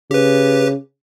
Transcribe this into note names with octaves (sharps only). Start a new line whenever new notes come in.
C#3 G4 B4